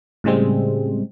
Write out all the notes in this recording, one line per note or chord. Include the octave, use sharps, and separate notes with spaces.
A2 C#3 G3 G#3 C4